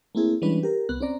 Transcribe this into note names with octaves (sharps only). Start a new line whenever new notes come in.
A3 A#3 C4 E4 G#4
E3 G3 G#3 C#4 D4 B4
G4 A#4
C2 B3 F#6
C4 C#4 D5 A#5